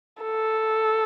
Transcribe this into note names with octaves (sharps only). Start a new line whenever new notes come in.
A4